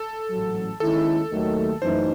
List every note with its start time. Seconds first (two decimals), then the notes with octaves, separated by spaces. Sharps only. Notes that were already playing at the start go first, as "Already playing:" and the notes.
Already playing: A4
0.30 A1 G#2 F#3
0.80 D#2 D#3 G#3 C#4 E4 A4
1.31 D#2 D#3 F#3 A3
1.82 F#2 E3 A3 D#4 C5